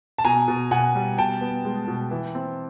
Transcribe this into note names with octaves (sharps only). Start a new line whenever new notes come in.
A5
B2 G#5 A#5
B2
B2 F#5 G#5
G3
B2 G5 A5
B3
G#3
B2
E3
C4